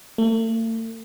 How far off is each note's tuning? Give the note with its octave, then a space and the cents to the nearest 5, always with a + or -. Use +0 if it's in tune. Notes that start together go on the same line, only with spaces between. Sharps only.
A3 +40